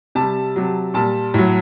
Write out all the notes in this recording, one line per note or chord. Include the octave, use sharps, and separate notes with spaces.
C3 G3 A5
C3 F#3
A#2 G3 A5
A2 F#3